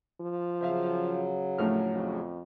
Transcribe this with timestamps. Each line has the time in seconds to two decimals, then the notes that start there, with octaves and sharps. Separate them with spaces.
0.21 F3
0.61 C#3 F#3 C5 E5 F5
1.58 A#1 A2 A3 F6
1.93 F2